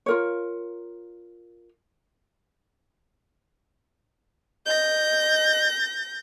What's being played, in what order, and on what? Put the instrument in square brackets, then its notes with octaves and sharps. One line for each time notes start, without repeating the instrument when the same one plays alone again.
[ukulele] F4 A#4 C#5
[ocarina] D#5 [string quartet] G6 A#6